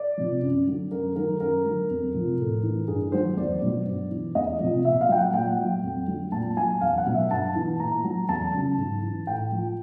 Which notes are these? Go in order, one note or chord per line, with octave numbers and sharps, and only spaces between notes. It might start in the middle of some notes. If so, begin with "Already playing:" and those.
Already playing: D5
C3 F3
F#2
D3 F#3
F#2 A#4
D#3 F#3 A#4
F#2 A#4
D3 F#3
F2
C3 F3
A2
E3
G2 G#4
D#3 F#3 C5
E2 D5
B2 F#3
G2
E3
E2 D#5
C3 F3
A#2 E5
F5
F#3 G5
F#5
A#2 G5
F#3
F2
D3 F#3
A#2 A5
F#3 G#5
E2 F5
F#5
B2 F#3
E5
G2 A5
E3
A#2 A#5
F#3
E2 A5
C#3 F#3
G#2
E3
A2 G5
F3